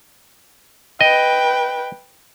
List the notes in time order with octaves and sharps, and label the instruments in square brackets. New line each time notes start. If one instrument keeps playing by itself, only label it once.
[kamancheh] B4 G5 [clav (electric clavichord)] D#5